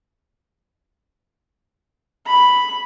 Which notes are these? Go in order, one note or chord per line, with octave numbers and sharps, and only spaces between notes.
B5